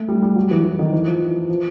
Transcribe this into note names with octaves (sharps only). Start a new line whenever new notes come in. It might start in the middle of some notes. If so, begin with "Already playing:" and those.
Already playing: A3
G3
G3
F#3
E3
E3
D#3
E3
F3
E3
F3